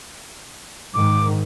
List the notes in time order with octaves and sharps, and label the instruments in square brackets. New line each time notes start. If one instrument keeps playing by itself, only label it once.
[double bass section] G#2 D#3 [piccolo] D6